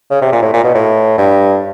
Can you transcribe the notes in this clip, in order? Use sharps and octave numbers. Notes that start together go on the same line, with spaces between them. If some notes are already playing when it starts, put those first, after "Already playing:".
C#3
C3
A#2
A2
A#2
B2
A2
G2